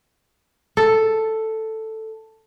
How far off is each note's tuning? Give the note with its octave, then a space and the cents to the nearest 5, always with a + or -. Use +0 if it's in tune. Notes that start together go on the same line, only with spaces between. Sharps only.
A4 +5